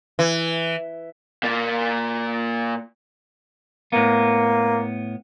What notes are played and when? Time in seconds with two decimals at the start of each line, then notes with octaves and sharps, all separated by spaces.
0.19 E3
1.43 A#2 A#3
3.92 A2 A#3 B3